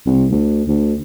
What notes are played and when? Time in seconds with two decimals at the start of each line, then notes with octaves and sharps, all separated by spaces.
0.06 C2
0.31 D2
0.68 D2